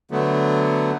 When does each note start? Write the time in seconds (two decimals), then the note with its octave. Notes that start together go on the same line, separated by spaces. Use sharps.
0.11 D3 F#3 A3 B3